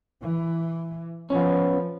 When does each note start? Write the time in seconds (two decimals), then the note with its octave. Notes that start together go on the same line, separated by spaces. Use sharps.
0.22 E3
1.30 F3 B3 C#4